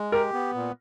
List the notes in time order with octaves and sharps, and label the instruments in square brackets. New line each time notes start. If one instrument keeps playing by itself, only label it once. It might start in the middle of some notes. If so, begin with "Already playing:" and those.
Already playing: [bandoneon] G#3
[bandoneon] G4 [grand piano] A#4
[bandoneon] B3
A#2